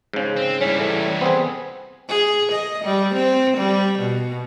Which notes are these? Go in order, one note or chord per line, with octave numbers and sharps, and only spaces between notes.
G#2 C#3
C4
E3 G3 C#4
A2
B3 C4 G#4
G#4
D#5
G3
C4
G3
B2